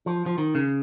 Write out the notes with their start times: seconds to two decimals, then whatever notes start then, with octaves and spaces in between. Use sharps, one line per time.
0.06 F3
0.26 F3
0.38 D#3
0.55 C#3